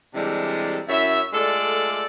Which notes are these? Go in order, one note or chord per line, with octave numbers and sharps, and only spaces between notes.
C3 E3 G3 G#3 D4 A4
F#2 E4 C#5 E5
G#3 A3 F4 A4 D5